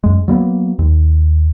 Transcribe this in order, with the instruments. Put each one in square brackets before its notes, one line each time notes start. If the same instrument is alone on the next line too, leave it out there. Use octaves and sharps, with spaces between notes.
[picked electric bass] F#2 G#3
F#3 G3 A#3 B3
D#2